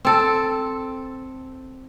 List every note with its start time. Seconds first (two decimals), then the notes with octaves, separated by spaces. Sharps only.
0.05 C4 A4